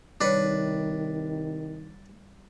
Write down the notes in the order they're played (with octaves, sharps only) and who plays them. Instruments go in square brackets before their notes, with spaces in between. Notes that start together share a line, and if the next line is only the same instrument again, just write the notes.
[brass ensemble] C2 D#3 [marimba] G3 C#5 [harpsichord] D4 B4